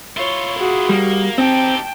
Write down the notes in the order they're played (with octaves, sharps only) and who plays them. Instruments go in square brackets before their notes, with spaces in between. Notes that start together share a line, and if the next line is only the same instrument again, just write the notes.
[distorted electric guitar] E4 F4 [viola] C#5
[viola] F#4 G#4
[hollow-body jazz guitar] G3 [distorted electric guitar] A#3
[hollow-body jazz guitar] C4 [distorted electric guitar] D#4 G4 [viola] G5 A5